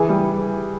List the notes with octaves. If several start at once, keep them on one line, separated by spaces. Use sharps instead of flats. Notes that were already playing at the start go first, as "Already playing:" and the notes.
Already playing: E3 G#4
G3